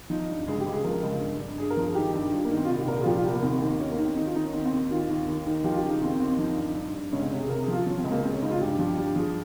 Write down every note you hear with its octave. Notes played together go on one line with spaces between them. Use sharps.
F3 D#4
G2
C#2 G#4
G4
C#2
G#4
F3 A#4
C#2
G2
G2
G2 G#4
A#4
F3
G#4
D#3 G4
G2 G4
G2 F4
A#3
D#3
C4
F4
C2 D#4
G4
A#2 A#4
G#4
F4
F3 G4
F4
C2 G4
A#3
D#2 C4
D#2
D#3 C#4
A#3
D#3
C4
D#3 D#4
F4
D#3 D#4
C#4
D#3 C4
C4
D#2
D#3 F4
D#2
D#2
D#3
F3 G4
F4
G4
C#3
D#4
D#2 C4
D#2 C4
F3 D#4
G2
G2
G2
C#2 C#4
C4
C3 C#4
G#4
C3 A#4
G#4
F3
F4
F3 C#4
C4
C#2
A#3
C#3 C4
C#4
C#2 D#4
F4
G2 G4
F3 G4
G2 G4
F3 G#4